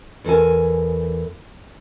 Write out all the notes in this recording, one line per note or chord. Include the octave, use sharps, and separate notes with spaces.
E2 A4 A#4 G#5